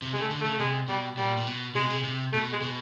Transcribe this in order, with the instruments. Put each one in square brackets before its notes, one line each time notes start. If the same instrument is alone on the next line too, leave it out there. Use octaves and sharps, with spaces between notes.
[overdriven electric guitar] C3
[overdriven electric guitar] C#3 [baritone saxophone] G#3
[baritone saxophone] A3
[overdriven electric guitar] D3
[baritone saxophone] A3
[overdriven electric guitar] C#3
[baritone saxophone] A3
[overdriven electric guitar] C3 [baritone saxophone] G#3
[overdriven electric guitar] B2 [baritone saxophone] G3
[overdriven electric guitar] A#2 [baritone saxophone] G3
[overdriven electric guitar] A#2
B2
[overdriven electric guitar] C3 [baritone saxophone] G#3
[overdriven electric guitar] B2
C3
C3
[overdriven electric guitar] B2 [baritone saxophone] A3
[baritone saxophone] G#3
[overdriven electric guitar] B2